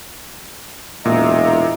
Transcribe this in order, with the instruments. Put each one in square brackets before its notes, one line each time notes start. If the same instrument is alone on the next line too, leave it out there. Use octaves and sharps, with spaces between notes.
[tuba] E1 [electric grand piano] A#2 [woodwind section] D#5 E5 A#5